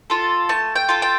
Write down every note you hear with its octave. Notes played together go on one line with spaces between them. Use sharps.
F4 A4
A3 A5
G5
F4 A4
G5